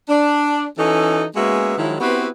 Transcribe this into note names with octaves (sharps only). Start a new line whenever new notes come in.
D4
E3 C#4 D#4 F#4 A4
G#3 A#3 B3 C#4 F#4 E5
D#3 F3 F#3 G#3 E4
B3 C4 E4 F#4 G4 B4